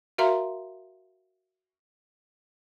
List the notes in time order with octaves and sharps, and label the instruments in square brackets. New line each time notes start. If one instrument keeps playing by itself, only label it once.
[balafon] F#4 A#4 E5 F5 A#5 C6